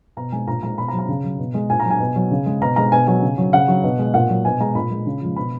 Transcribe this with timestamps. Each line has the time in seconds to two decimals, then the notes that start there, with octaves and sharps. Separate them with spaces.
0.17 B2 A#5
0.32 G#3 G#5
0.47 A#2 A#5
0.63 G#3 A#5
0.78 B2 B5
0.88 A#5
0.93 F#3
0.99 A#5
1.09 C#3
1.24 F#3
1.39 B2
1.54 G#3
1.70 A#2 G#5
1.80 A#5
1.85 F#3
1.90 G#5
2.00 B2
2.16 F#3
2.31 C#3
2.46 G#3
2.62 B2 A#5
2.76 G#3 A#5
2.92 B2 G#5
3.07 F#3 G#5
3.22 C#3
3.38 F#3
3.53 C#3 F#5
3.68 F#3
3.84 B2
3.99 G#3
4.14 A#2 F#5
4.29 F#3
4.45 B2 G#5
4.60 G#3 A#5
4.75 A#2 B5
4.91 G#3
5.06 C#3
5.21 F3 G#3
5.36 B2 B5